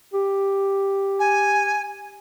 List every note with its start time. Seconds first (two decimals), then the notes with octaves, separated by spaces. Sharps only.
0.14 G4
1.19 G#5